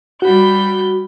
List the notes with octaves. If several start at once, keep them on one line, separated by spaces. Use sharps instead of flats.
G3 F#4 B5 G6